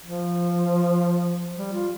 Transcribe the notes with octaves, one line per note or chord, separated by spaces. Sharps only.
F3
G3
F4